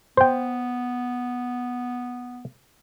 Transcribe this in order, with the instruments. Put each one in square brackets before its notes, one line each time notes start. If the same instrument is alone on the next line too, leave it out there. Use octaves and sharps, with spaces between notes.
[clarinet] B3 [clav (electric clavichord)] C5 G5